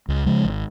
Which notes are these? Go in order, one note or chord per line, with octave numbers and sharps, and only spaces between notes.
C#2
C#3 F3 G#3
G#1